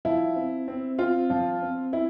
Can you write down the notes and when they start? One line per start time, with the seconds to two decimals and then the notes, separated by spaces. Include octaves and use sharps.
0.05 F3 E4
0.36 C4
0.68 C4
0.99 C4 F4
1.30 F3
1.62 C4
1.93 C4 E4